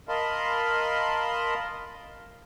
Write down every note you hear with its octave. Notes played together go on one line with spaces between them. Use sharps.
A#4 D#5 F5 A5 B5 C6